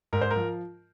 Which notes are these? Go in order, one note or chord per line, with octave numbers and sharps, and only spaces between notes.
G#2 A#4
C5
A#4
F3